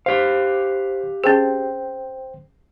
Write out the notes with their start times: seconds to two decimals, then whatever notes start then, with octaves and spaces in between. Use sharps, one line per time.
0.06 G4 C5 F5
1.24 C#4 G#4 C5 G5